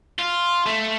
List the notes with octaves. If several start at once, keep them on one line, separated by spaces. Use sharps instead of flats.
F4
A3